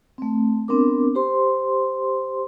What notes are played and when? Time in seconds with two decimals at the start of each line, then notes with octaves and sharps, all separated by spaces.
0.18 A3 C4
0.68 B3 C4 D4 A#4 D6
1.15 G4 C5 C6